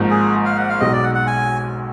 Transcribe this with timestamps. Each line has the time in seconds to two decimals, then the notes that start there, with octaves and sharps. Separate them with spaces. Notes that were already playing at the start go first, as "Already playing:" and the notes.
Already playing: G#1 G#2 F3 A#3
0.11 G#4
0.45 F5
0.57 F#5
0.69 F5
0.80 B1 B2 G#3 D#4 D#5
0.93 D5
1.03 F#5
1.15 F#5
1.27 G#5